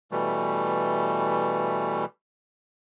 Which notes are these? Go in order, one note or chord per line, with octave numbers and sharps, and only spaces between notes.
B2 E3 G3 A3